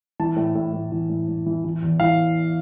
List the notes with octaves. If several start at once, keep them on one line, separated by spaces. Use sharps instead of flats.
E3 A5
A2
A2
A2
E3
A2
A2
E3
E3
E2
E3 F5